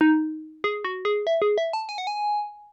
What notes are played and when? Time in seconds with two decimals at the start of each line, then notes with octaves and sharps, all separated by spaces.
0.01 D#4
0.64 G#4
0.85 F#4
1.05 G#4
1.27 E5
1.42 G#4
1.58 E5
1.73 A5
1.89 G#5
1.98 F#5
2.07 G#5